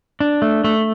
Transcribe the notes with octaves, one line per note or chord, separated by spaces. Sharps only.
D4
A3
A3